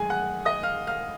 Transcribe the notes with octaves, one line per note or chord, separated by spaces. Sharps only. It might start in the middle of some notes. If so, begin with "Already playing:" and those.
Already playing: F#2 D#3 G#3 G#4 G#5
F#5 F#6
D#5 D#6
F5 F6
F5 F6